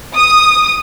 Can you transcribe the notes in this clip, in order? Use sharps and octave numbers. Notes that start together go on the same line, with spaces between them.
D#6